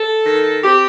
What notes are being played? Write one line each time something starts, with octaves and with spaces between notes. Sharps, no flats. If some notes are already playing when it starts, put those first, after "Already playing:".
Already playing: A4
D#3
C4 G4